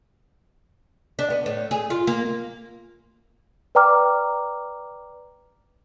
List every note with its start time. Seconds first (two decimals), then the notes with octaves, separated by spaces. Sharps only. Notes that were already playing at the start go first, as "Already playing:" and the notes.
1.19 D4
1.30 B3
1.46 A2
1.71 G#4
1.90 F4
2.07 A#3
3.75 B4 D5 G5 A#5 D6 F6